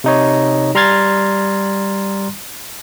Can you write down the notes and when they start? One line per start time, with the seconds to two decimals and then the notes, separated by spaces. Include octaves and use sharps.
0.04 C3 D#4 C#5
0.75 G3 A#5 C6 F6 G#6 A6